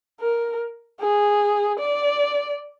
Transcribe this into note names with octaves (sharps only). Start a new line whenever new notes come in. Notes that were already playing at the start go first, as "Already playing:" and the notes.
A#4
G#4
D5